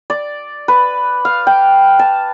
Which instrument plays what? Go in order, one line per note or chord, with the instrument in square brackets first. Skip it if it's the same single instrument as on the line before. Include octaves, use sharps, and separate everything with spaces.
[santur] D5
B4
F5
G5
A5